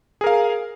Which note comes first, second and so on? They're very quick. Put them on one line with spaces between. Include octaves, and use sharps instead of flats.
G#4 A#4 F5